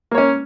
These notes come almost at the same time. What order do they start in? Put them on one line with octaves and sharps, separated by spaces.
A#3 C#5 C#4